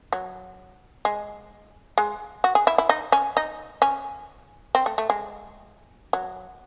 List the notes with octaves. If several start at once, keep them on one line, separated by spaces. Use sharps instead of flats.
F#3
G#3
G#3
F#4
G#4
E4
E4
D#4
C#4
D#4
C#4
C4
A3
A3
G#3
F#3